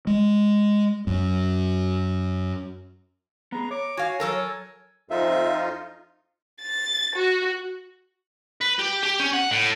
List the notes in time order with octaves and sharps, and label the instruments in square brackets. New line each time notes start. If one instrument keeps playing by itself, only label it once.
[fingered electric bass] G#3
F#2
[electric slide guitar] B3 G#4 [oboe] A#5
[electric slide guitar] C#5 [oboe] D6
[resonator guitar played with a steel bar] F#4 F5 [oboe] G#5
[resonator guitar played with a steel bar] F#3 A4 A#4
[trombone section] F2 [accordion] D#4 F4 [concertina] E5
[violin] A6
F#4
[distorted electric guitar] B4
G4
G4
C#4
F#5
A2